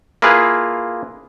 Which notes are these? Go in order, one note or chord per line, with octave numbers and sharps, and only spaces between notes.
A#3 E4 F4 G#4 B4 F5